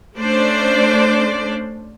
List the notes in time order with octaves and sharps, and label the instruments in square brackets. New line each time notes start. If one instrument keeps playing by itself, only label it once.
[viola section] A3 C#4 D4 C5 D5